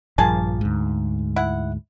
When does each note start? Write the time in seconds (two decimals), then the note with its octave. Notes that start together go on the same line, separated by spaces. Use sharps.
0.18 A#1 G2 F3 A#3 G#4 A5
0.61 D2 G#2
1.36 E4 F#5